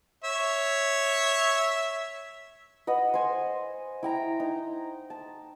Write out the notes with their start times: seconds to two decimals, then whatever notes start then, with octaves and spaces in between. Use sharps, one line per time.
0.24 C#5 E5
2.87 B4 D#5 F#5
3.14 C5 G#5
4.03 E4 G5 A#5
4.40 D#4
5.10 A5